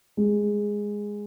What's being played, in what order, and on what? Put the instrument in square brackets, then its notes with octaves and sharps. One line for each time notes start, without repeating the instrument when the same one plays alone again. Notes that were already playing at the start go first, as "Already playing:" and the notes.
[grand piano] G#3